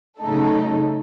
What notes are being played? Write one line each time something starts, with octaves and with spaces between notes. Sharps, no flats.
C#3 F#3 A3 D#4 A4